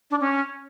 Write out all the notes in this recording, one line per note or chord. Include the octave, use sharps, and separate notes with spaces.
D4
C#4